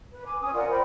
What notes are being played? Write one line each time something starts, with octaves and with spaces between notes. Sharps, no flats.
B4
G#5 D6
C#4 G#5 D#6
F4 A#4 D5 F#5
A#4 C5 G5 B5